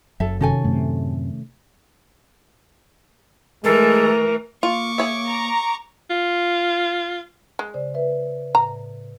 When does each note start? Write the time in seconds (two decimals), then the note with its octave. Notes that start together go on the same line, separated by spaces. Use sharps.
0.20 F#1 F#2 F#3 A4 E5
0.41 C3 D#3 C#4 F#4 A4 G#5
0.64 F#2 A2 C3 A3
3.64 E3 G#3 A3 A4 A#4
4.63 A#3 F4 C#6 D6
4.98 G#4 C#5 E5
5.28 A#5
6.10 F4
7.59 G#3
7.74 C#3 C5 D5
7.94 B4 E5
8.55 A2 A#5